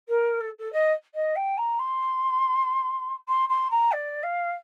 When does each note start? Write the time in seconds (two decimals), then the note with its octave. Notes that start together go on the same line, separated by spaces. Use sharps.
0.08 A#4
0.40 A4
0.59 A4
0.72 D#5
1.14 D#5
1.35 G5
1.57 A#5
1.79 C6
3.28 C6
3.49 C6
3.70 A#5
3.92 D5
4.23 F5